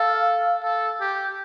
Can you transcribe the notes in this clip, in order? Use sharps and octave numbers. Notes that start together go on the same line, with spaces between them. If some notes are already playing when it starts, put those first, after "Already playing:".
Already playing: A4 F5
A4
G4